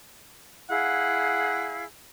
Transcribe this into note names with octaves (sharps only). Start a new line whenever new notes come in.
E4 G#4 F5 F#5